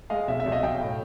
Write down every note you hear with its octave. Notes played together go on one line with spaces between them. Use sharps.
G#3 D#5 F5
B1 E5
E5
B1
D#5 F5
B1 F5 G5
A2